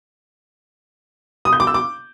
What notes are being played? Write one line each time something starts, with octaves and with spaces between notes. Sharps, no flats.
D#6
G6
D6
E6
D6